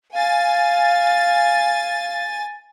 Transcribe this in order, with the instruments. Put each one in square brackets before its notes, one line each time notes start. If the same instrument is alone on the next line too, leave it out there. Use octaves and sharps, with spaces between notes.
[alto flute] F5 [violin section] G#5 A6